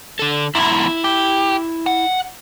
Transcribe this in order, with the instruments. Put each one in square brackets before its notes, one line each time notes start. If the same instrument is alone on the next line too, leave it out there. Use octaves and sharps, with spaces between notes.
[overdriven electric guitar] D3 A4
[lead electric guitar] E2 G#2 [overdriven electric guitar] E4 B5
[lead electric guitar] G4
F#5